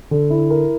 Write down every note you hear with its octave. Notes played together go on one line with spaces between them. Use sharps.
D3
E4
A#4